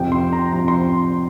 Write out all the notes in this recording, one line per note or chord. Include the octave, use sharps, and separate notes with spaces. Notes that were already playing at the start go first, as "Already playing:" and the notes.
Already playing: F2 C3 F3 G5
C6
A#5
F2 C3 F3 A#5
C6